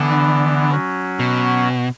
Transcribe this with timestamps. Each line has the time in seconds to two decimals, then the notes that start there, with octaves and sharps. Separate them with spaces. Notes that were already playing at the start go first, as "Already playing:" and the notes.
Already playing: D3 E3 B3 D4
0.70 F#3 C#4 F#4
1.19 B2